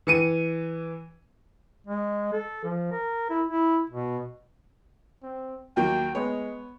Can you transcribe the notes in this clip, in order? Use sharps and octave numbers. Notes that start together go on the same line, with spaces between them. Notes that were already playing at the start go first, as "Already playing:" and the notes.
E3 C#7 D#7
G#3
A4
F3
A#4
E4
E4
B2
C4
D#2 F#3 A#3 G5
G#3 B3 C#5